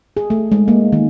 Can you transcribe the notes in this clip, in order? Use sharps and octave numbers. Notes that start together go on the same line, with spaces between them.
G#4
A3
G#3
A#3
D#3